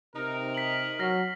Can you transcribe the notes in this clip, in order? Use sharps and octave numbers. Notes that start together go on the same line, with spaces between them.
C3 D#4 A#4
B6 F#7
F#3 F6 A#6 C7